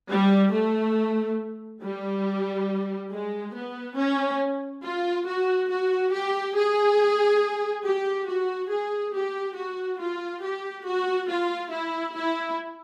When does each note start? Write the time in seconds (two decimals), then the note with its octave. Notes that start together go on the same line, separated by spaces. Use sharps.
0.11 G3
0.53 A3
1.82 G3
3.11 G#3
3.54 B3
3.97 C#4
4.83 F4
5.26 F#4
5.69 F#4
6.13 G4
6.56 G#4
7.84 G4
8.27 F#4
8.70 G#4
9.14 G4
9.56 F#4
10.00 F4
10.42 G4
10.85 F#4
11.29 F4
11.72 E4
12.15 E4